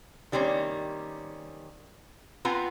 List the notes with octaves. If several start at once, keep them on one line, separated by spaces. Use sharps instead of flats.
D#3 G3 A#3 C4 C#4
B3 C4 F4 G#5 A#5